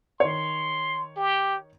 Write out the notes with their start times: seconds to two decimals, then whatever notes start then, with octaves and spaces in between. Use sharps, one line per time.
0.20 D#3 C#5 C6
1.17 G4